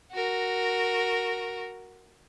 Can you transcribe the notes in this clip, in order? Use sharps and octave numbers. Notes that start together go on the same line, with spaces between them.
F#4 A#4